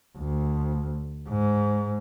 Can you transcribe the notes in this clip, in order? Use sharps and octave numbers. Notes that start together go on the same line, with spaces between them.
D2
G#2